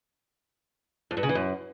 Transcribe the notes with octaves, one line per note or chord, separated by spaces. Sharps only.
F2
G2
C#3
E3
F#2